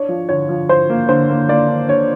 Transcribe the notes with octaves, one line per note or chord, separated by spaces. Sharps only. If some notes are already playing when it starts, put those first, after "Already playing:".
Already playing: D4 C#5
F3
D3 C#5
F3
F3 C5
A#3
D3 C5
A#3
A#3 D5
D4
D3 C#5